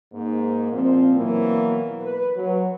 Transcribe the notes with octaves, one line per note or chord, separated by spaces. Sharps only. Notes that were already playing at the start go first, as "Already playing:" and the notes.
G#2 A#3
A#2 F3 C4
B2 E3 F#3 A#3
B4
F#3